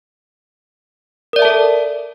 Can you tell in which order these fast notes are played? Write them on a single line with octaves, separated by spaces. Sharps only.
A#4 D5 E5 A5 A4